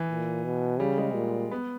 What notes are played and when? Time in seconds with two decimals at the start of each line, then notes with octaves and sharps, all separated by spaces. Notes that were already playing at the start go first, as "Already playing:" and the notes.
Already playing: E3
0.08 A#2
0.45 B2
0.80 C#3 G3
0.98 G#3
1.15 A#2
1.51 B3